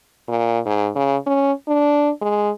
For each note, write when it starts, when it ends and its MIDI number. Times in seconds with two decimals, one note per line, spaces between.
0.28 0.59 46
0.66 0.90 44
0.96 1.16 49
1.27 1.52 61
1.68 2.10 62
2.22 2.50 56